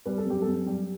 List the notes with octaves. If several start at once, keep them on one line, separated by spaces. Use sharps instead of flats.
G3 B4
A4
F#2 G4
A4
F#2
G3 G4